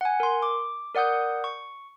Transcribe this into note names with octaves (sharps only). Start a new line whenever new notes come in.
F#5 G#5
A#4 C6
D6
A#4 D5 F#5 D#6 G6
C#6